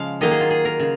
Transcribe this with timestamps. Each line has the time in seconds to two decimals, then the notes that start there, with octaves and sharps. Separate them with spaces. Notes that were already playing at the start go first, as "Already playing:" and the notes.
Already playing: C#3 F3 G#3 F5
0.21 D#3 F#3 A#3 D#5
0.31 G#4
0.41 F4
0.50 G#4
0.65 A#4
0.80 C#3